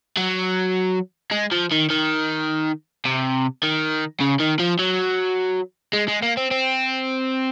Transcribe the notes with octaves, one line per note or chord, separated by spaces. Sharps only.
F#3
G#3
F3
D#3
D#3
C3
D#3
C#3
D#3
F3
F#3
G#3
G#3
A#3
C4
C4